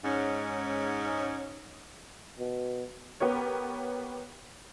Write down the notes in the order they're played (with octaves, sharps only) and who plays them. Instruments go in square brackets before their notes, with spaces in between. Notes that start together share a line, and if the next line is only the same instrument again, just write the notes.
[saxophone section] G#2 C#4
[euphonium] B2
[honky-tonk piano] B3 G4 A#4 C#5